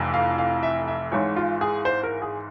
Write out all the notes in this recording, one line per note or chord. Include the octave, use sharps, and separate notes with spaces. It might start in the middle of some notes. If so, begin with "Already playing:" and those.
Already playing: F1 F2 E3
F5
F5
E5
E5
G#1 G#2 E3 C#5
F4
G#4
C5
A#4
G#4